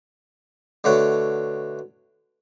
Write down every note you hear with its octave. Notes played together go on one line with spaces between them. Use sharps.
B2 D3 A3 C#5 F#5